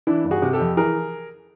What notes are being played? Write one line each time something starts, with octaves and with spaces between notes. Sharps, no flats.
E3 D4 E4
G1
F#4 G#4
C3
G4 A4
F2
E3 G#4 A#4